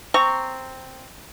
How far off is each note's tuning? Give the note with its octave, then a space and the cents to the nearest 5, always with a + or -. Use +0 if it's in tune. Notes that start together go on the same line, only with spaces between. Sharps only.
C4 +0 A#5 -15 C#6 +0